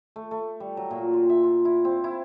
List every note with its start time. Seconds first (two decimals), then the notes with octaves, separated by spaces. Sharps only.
0.16 A3
0.31 A3
0.60 G3
0.77 F#3
0.91 A#2
1.14 F4
1.29 E5
1.43 F4
1.65 E4
1.85 C4
2.04 E4